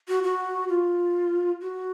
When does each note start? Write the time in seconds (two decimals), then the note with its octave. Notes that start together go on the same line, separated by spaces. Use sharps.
0.08 F#4
0.23 F#4
0.69 F4
1.61 F#4